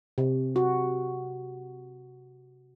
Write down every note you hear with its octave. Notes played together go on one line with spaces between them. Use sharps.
C3
F#4